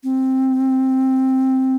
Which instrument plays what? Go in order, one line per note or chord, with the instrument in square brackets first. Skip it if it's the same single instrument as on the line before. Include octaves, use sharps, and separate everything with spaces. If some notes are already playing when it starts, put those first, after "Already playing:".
[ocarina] C4